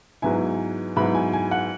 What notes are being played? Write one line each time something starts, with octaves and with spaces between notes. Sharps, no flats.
G#2 F#3 B3 E4 G#5
G#2 F#3 B3 E4 B5
G#5
G#5
F#5